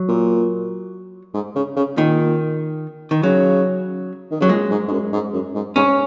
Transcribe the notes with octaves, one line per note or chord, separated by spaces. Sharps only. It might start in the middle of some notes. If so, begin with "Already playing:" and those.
Already playing: F#3
A#2
G#2
C#3
C#3
A#2 D#3
D#3
C#3 F#3
D#3
C#3 F#3
A#2 G#3
G#2
G#2
F#2
G#2
F#2
G#2
G#2 C#4